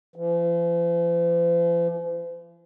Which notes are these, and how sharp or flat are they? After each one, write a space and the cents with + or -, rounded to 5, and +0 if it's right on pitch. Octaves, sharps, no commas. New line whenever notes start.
F3 -45